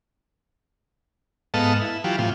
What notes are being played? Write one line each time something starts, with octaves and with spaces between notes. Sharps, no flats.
G#2 B3 A4 D#5 F5 A5
E4
E3 F#3 F4 G4
A2 C3 F4